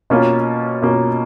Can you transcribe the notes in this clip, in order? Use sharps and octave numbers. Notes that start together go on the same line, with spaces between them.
B2 A#3 C#4 F4
B2 A#3 C#4 F4